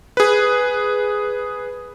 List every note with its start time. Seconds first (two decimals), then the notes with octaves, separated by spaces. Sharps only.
0.17 G#4 B4